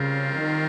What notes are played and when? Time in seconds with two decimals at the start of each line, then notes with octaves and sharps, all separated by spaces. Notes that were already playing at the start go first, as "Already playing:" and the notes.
Already playing: C#3 G3 C4 F4 A#4
0.36 D#3